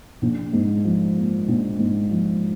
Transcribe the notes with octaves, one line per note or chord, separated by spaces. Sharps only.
A#1
G#2
F3
A#3
A#1
G#2
F3